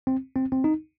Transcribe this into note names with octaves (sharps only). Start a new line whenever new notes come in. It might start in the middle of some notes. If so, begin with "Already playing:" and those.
C4
C4
C4
D#4